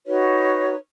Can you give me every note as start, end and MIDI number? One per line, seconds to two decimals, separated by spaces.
0.06 0.73 63
0.06 0.73 66
0.06 0.73 71
0.06 0.73 73